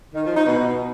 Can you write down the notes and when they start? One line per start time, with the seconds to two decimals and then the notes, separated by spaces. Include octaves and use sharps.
0.14 D#3
0.24 F3
0.35 D#4
0.46 B2